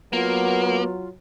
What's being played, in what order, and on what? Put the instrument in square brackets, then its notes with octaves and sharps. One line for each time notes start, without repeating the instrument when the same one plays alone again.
[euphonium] F#3 [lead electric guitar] A#3 [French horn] B3 [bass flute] F4